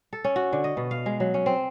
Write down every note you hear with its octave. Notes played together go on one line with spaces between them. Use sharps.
A4
C#4
F#4
D3
D#5
B2
F5
G#3
F#3
C#4
C4